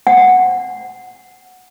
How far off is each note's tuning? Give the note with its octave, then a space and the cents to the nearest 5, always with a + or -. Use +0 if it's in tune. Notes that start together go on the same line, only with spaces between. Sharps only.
F#5 -10